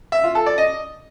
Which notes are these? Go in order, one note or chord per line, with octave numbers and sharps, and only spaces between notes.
E5
F4
A4
D5
D#5